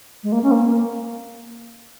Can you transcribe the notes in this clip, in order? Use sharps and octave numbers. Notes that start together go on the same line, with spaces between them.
G#3
A#3
C#4
A#3